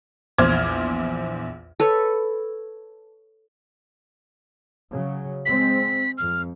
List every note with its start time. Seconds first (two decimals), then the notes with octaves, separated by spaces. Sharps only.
0.38 A#1 E2 C5 D6 F6 G#6
1.80 A4 B4 C#5
4.90 C#3 F#3
5.46 G#3 C4 B6
6.18 F2 F6